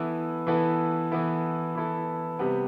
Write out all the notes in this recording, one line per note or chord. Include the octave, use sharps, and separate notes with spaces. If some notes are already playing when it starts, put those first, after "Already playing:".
Already playing: E3 B3 E4 A4
E3 B3 E4 A4
E3 B3 E4 A4
E3 B3 E4 A4
C3 G3 B3